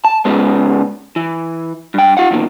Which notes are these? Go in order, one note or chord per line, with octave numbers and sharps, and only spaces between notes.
A5
G#2 C#3 G#3 B3
E3
G2 G5
F4 F5 F#5
E2 A#2 D#3